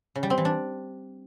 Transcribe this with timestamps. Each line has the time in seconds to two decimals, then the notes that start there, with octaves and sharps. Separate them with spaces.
0.15 C#3
0.23 G3
0.30 C4
0.38 E3
0.45 D4